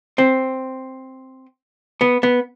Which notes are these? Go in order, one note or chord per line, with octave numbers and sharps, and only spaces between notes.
C4
B3
B3